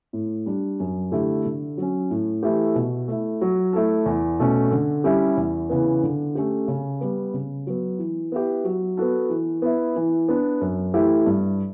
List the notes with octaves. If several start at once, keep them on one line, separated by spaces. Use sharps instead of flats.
A2
G3 D4
F#2
D3 A3 E4 G4
D3
F#3 C#4
A2
E3 A3 E4 G4
B2
A3 E4
F#3
A3 E4 A4
E2
B2 A3 C#4
D3
G3 C#4 E4 G4
E2
C#3 E3 B3
D3
A3 C#4 G4
C#3
G3 B3
C#3
F#3 B3
E3
B3 E4 G4
F#3
B3 F#4 A4
E3
B3 E4
E3
B3 D4
F#2
E3 A3 E4 G4
G2